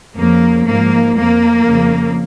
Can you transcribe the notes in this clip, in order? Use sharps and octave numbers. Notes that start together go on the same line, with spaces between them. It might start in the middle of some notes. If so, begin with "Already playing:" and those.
F2 C#3 F3 A#3
G#2 F3 A#3
F2 F3 A#3
F2 C#3 F3